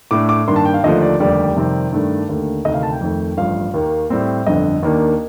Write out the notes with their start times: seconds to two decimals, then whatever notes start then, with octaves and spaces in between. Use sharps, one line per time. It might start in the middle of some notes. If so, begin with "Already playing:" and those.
0.11 A2 A3 D4 D6
0.29 D6
0.48 G2 D#3 A#3 D4 C6
0.56 A5
0.65 G5
0.74 F5
0.84 D#2 D3 F3 A3 D4 D#5
1.02 D5
1.20 F1 D#2 D3 G3 D5
1.56 F2 C3 D#3 G3 C4
1.92 G2 D#3 A3 D4
2.29 D#2 D3 A3
2.65 D2 C3 D#3 D#5
2.74 F5
2.83 A5
2.92 G5
3.01 F2 D#3 A3
3.37 A1 G2 F3 F5
3.74 D#2 D#3 A#3
4.10 A2 G3 C4
4.46 G1 F2 D3 D#5
4.83 D#2 D#3 A#3 D4